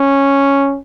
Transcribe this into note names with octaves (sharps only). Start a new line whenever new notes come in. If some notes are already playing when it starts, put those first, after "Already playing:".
Already playing: C#4